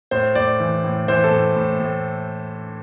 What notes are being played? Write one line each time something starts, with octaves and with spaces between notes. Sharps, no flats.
A2 C5
A2 D5
E3
A2
E3 C5
A4
A2
A2
A2